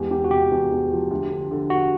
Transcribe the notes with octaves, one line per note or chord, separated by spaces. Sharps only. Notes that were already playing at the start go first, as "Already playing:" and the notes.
Already playing: E2 G#3 G4
E2 G4
F#4
C3 G4
E2
E2
F3
D2
D3
D3
D3 F#4